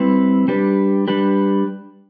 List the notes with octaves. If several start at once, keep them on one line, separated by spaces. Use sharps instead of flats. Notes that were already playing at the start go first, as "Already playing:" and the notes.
Already playing: G3 C4 E4 B4
G3 D4 G4 B4
G3 D4 G4 B4